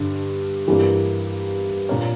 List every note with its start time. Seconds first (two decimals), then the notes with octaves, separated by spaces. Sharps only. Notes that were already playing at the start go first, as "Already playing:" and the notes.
Already playing: G2 D3 G3
0.68 G2 E3 G3 A#3 D4
1.89 A#2 A#3 D4 A#4 C#5